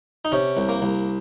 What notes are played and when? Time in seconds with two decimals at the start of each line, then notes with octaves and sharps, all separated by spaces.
0.25 D#4
0.32 C3 C#4
0.57 C2
0.69 A#3
0.82 C2